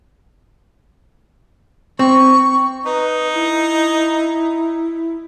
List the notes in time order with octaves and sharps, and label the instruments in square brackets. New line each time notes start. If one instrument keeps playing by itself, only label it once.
[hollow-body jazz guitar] C4 [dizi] C#6
[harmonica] D#4 [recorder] B4
[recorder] E4